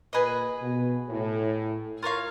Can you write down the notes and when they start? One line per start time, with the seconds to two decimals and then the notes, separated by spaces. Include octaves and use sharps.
0.13 A#2 G#4 B4 D#5
0.61 B2
1.08 A2
2.03 F4 A#4 C#5 F5